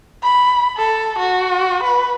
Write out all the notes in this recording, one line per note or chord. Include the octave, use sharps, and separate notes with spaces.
B5
A4
F#4
B4